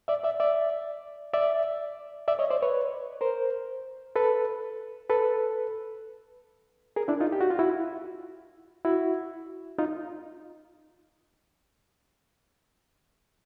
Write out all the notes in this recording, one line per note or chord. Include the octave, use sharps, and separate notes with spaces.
D5 E5
D5 E5
D5 E5
D5 E5
D5 E5
C#5 D#5
C5 D5
B4 C#5
A#4 C5
A4 B4
A4 B4
G#4 A#4
D4 E4
D#4 F4
G4
F#4
F4
E4 F#4
E4 F#4
D#4 F4